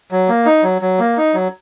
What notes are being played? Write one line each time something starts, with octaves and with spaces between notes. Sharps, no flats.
F#3
A#3
D#4
F#3
F#3
A#3
D#4
F#3